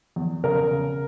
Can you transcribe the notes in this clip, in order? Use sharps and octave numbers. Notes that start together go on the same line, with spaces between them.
E2
C#3 A#4
C#3